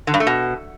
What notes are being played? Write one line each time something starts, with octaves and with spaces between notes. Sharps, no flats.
D3
G2
A3
B2